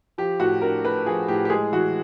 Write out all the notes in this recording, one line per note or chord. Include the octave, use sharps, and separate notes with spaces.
F3 G4
A2 F#4
D4 A#4
A3 B4
F3 G#4
A2 G4
G4
G#3 G#4
E3 F#4